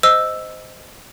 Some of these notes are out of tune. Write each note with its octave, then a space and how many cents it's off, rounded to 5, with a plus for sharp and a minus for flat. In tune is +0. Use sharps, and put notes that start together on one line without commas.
C5 -15 D#5 +5 E6 +0